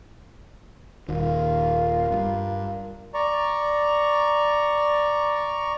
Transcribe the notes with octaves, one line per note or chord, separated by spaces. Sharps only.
D#1 D#3 F4 A#4
G2
D5 A#5 C#6